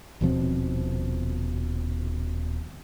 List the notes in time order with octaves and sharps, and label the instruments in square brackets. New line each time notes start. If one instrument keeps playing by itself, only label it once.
[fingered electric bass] D#1 B2 F3 C4